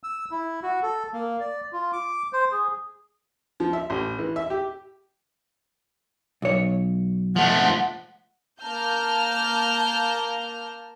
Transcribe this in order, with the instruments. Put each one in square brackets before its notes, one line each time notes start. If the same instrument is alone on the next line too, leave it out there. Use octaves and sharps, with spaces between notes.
[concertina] E6
E4
F#4
A4
A#3
D5
F4
D6
C5
G#4
[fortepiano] F3
E5
A1
E3
E5
G4
[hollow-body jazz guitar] B1 C#5
[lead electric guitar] F3 A3 [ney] F#5
[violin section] A#3 A5 A#5 F6 G6